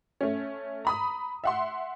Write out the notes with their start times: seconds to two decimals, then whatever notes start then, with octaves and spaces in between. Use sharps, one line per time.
0.21 A3 C#4
0.85 A#5 B5 D#6
1.44 E5 F#5 C6